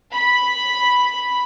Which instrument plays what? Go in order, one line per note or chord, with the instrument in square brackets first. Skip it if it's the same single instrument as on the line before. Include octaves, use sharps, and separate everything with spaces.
[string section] B5